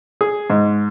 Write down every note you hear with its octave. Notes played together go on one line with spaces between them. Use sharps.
G#4
G#2